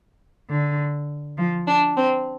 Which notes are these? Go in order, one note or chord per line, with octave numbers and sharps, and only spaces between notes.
D3
F3
D4
C4